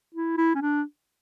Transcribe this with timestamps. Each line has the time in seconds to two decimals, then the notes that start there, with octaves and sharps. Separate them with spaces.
0.14 E4
0.37 E4
0.55 C#4
0.61 D4